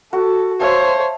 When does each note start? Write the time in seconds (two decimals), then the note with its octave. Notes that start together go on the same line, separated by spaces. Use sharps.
0.13 F#4 A4
0.60 C5 C#5 E5 F5 A5